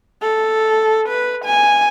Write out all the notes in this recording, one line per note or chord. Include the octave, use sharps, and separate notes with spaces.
A4
B4
G#5